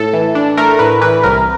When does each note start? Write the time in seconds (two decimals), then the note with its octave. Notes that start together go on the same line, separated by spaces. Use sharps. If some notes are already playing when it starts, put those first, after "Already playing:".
Already playing: A2 A4
0.13 E3
0.35 D4
0.57 A3 A#4
0.79 A2 B4
1.01 E3 B4
1.23 C2 A#4